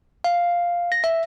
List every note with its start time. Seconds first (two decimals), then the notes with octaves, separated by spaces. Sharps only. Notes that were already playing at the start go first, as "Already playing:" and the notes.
0.24 F5
0.92 A#6
1.04 E5